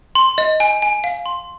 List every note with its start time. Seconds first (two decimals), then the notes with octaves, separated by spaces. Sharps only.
0.15 C6
0.38 D#5
0.60 G#5
0.82 G#5
1.04 F5
1.26 C6